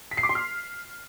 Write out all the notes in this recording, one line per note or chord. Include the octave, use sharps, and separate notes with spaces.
B6
C7
D6
C6
F6